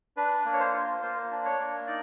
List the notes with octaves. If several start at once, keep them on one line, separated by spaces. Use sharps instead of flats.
D4 B4
A#3
C#5
C5
F4
A#3 C5
D4
C#5
A#3
D#4 D5